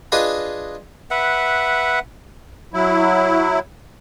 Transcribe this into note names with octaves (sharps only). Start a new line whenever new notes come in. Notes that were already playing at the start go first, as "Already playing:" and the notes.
D4 F4 G#4 B4 D#5
B4 E5 F#5
F#3 E4